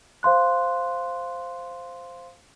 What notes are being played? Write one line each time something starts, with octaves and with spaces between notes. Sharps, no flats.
C5 F5 C6 F#6